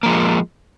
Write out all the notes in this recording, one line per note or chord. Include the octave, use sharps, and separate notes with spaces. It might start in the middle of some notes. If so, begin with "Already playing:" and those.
F3 G#3 A#3